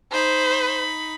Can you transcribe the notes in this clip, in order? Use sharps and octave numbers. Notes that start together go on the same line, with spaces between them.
D#4 C5 B5